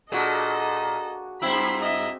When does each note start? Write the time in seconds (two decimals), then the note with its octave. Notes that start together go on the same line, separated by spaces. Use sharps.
0.12 A#2 D4 F#4 G#4 A4 D#5
1.42 G2 C4 E4 B5 C6 E6
1.81 D#5 E5